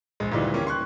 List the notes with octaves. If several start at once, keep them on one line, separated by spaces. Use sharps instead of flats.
A#1 G#3
D2 A#2 D#3 E3 G3 G#3
E3 A#3 C#4 G4
C6 C#6 F#6